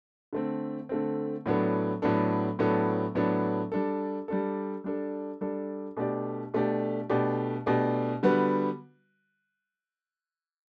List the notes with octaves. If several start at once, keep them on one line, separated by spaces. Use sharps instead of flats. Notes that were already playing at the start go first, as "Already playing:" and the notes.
D3 A3 C4
D3 A3 C4
A2 F#3 B3 D4 A4
A2 F#3 B3 D4 A4
A2 F#3 B3 D4 A4
A2 F#3 B3 D4 A4
G3 D4 A4
G3 D4 A4
G3 D4 A4
G3 D4 A4
B2 A3 D4 G4 D5
B2 A3 D4 G4 D5
B2 A3 D4 G4 D5
B2 A3 D4 G4 D5
D3 G3 B3 F#4 B4